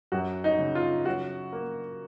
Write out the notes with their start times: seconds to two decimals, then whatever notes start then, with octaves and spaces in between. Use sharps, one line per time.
0.12 F#2 F#4
0.44 D#4
0.59 C#3
0.75 F4
1.05 F#3 F#4
1.53 A#3